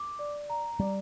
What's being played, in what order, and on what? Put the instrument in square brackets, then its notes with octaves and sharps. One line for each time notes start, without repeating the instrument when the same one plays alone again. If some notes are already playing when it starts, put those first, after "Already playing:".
Already playing: [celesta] D6
D5
A#5
[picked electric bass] G3 [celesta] D5